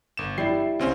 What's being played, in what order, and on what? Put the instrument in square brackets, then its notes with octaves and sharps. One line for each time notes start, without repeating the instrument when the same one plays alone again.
[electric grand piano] G1 E7
[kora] G3 E4 [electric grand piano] C7
[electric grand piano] C#2 C4 C#4